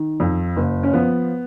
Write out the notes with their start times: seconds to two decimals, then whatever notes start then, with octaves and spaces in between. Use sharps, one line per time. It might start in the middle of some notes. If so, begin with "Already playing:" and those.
Already playing: D#3
0.20 F2
0.56 F#1
0.83 C#4
0.93 F3 B3